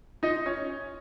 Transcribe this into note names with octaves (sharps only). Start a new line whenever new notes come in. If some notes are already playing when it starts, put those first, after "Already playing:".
D#4 F4 D#5
C#4 C#5